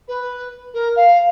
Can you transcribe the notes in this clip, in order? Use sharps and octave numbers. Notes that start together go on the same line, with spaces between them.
B4
A#4
F5